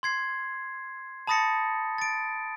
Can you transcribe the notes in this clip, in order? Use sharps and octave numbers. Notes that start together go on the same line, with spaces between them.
C6 G#6 C7
A5 B5 D#6 A6 A#6 C#7
A6 D7